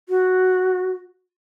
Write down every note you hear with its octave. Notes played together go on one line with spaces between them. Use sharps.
F#4